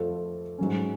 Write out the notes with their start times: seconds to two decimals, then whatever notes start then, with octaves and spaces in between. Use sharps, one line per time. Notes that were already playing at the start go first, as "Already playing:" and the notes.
Already playing: F2 F3 A3 F4 A4
0.58 G#2 F#3 C#4